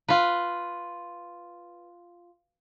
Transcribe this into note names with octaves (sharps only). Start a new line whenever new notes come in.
F4 B4